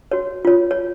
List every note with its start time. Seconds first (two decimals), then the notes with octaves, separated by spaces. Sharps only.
0.12 F#4 C#5
0.45 F4 C#5
0.71 C#5